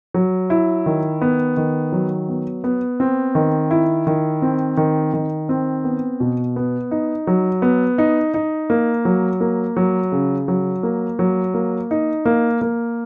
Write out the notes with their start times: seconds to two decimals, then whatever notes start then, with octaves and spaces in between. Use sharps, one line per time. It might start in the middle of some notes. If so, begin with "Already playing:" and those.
0.14 F#3
0.50 E4
0.86 D#3
1.21 B3
1.57 D#3
1.93 F#3
2.28 B3
2.64 B3
3.00 C4
3.35 D#3
3.71 E4
4.07 D#3
4.42 C4
4.77 D#3
5.14 D#3
5.49 C4
5.84 B3
6.20 B2
6.56 B3
6.91 D#4
7.27 F#3
7.62 B3
7.98 D#4
8.34 D#4
8.70 A#3
9.05 F#3
9.41 A#3
9.77 F#3
10.12 C#3
10.48 F#3
10.83 A#3
11.19 F#3
11.54 A#3
11.91 D#4
12.26 A#3
12.61 A#3